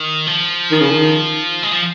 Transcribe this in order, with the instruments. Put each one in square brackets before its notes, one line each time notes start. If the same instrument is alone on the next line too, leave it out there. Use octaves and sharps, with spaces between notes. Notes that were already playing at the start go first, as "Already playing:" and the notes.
Already playing: [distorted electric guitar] D#3
F3
[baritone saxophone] D#3
C#3
D#3
[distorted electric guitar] G#3
F3